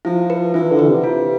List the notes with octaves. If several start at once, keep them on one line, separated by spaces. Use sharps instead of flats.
F3 E4
B4
E3 E4
D3
B4
C3
F4